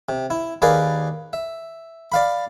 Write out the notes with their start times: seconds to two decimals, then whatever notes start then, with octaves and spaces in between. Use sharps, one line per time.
0.09 C3
0.30 E4
0.62 D#2 G#4 A#4 B4 D5 F5
1.33 E5
2.12 D5 F5 B5